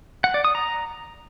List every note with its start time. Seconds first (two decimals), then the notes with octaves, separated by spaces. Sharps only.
0.24 F#5
0.34 D5
0.45 D#6
0.55 A#5